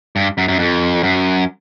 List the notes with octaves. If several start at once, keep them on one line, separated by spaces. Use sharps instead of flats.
G2
F#2
F#2
F2
F#2